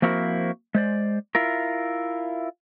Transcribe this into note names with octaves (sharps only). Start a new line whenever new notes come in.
F3 A#3 C4 E4 F#4 A#4
G#3 C5 D5
E4 F4 A#4